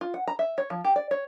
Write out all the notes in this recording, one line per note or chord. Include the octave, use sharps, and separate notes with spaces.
F4
F#5
A#5
E5
C#5
F3
G4
D5
C#5